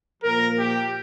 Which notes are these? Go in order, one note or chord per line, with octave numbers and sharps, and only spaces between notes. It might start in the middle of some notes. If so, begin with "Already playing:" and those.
A#2 F3 A#4
G4